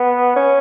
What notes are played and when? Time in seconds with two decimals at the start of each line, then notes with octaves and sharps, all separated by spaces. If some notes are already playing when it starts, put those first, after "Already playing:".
Already playing: B3
0.36 C#4